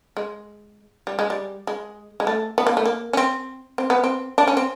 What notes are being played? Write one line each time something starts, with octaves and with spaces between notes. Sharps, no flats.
G#3
G3
G#3
G3
G#3
G#3
A3
B3
A#3
A3
A#3
C#4
C4
C4
B3
C4
D4
C#4
C4